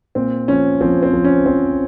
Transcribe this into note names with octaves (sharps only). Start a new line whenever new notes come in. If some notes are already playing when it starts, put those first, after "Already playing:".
A#2 C4
F3 C#4
F3 C4
C4
F3
C#4
F3 C4